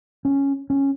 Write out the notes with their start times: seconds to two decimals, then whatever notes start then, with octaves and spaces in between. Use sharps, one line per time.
0.25 C#4
0.70 C#4